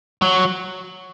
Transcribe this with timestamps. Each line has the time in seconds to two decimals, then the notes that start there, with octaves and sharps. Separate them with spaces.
0.22 F#3